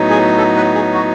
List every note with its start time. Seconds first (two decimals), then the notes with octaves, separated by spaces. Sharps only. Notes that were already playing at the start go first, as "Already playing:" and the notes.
Already playing: A2 F#3 B3 D#4
0.10 G#4
0.38 A4
0.56 B4
0.75 G#4
0.93 F#4